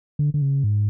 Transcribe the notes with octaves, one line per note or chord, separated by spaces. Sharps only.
D3
D3
C#3
G#2